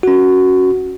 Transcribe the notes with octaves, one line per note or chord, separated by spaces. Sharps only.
C#4 F#4